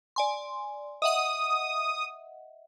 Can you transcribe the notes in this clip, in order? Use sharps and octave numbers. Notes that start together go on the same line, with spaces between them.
D5 G#5 C6
D#5 E5 F#5 D#6